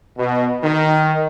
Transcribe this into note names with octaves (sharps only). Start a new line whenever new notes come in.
B2
D#3